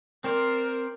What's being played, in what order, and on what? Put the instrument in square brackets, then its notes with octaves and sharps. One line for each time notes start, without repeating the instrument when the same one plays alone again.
[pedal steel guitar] C4 C5 D5 [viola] A#4